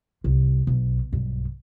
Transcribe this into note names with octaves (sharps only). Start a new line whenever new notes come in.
C2
B1
B1 G2